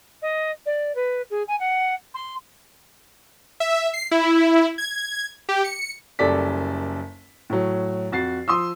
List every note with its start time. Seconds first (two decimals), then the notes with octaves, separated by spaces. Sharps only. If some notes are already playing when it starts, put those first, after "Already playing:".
0.21 D#5
0.65 D5
0.95 B4
1.30 G#4
1.47 G#5
1.59 F#5
2.14 C6
3.60 E5
3.94 C7
4.11 E4
4.78 G#6
5.49 G4
5.64 C#7
6.19 F#1 F#2 G3 A4 D5 B6
7.50 A2 F#3
8.12 F2 F#4 A6 C7
8.48 F3 C6 D#6 E6